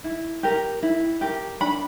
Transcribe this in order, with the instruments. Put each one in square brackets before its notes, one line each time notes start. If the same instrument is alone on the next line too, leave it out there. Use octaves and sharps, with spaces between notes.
[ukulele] E4
G4 A#4
E4
G4 A#4
D4 B5